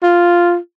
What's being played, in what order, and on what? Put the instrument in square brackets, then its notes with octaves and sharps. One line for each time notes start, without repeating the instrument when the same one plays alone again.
[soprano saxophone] F4